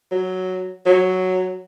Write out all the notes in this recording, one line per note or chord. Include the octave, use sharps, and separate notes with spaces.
F#3
F#3